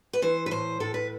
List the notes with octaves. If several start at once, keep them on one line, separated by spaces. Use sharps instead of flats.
B4
E3 C5
B4
A2 C5
A2 A4
B4